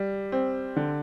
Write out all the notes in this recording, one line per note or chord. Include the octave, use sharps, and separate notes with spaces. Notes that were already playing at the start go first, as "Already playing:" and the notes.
Already playing: G3
C4
D3